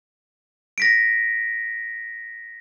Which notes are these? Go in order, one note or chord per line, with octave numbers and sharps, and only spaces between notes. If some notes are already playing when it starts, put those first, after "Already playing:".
A#6 B6 D7